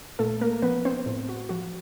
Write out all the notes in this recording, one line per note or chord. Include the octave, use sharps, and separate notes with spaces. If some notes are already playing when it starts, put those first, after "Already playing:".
A#2 A3 A4
A#3 A#4
F3 B3 B4
C4 C5
A2
F#4
F3 F#4